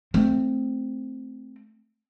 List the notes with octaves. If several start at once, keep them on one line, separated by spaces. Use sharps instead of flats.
A3 C4